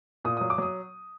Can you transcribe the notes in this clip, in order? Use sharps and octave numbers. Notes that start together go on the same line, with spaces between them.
A#2 D#6
D#6
F#3
D6
F#3 D#6